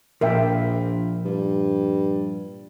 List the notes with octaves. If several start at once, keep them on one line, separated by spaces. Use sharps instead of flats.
A#1 A#2 F3 A#4 E5 G5
G2